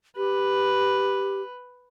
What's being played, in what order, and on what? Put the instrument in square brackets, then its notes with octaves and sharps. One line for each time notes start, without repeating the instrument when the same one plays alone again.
[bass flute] G4 [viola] B4